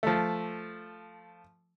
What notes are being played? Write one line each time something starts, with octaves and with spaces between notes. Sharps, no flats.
F3 A3